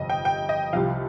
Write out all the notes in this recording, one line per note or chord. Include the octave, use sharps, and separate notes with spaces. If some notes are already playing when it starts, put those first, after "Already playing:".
Already playing: G1 F2 C3 D#5
G5
G5
D#5
C2 C3 F3 F5